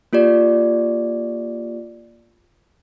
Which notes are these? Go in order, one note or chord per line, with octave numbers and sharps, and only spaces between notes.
A#3 F4 G4 D5